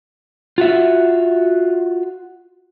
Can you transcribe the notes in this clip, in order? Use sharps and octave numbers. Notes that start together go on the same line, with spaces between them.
F4 F#4 E5